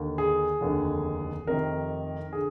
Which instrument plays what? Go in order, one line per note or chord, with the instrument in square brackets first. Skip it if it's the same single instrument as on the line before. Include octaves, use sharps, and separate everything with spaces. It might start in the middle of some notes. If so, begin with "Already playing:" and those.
Already playing: [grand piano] D#2 D3
G#4
F1 D#2 D3
F1 F2 C3 D#3 A#4
D3 G#4